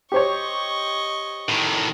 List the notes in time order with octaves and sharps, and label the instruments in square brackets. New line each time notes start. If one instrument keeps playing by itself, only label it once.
[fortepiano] G4 C5 C#5 [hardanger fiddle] D#5 C#6
[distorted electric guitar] A2 D#3